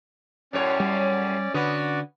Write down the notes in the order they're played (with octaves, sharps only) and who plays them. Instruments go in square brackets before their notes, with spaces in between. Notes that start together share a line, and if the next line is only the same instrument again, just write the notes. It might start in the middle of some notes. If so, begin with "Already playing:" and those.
[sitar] F#2 A2 C#5 [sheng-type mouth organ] C#4 D5
[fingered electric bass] G3
[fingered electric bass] D3 [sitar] B3 C#4 [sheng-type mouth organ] F#4 D5